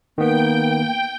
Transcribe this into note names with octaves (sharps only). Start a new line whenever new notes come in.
D#3 A#3 B3 G5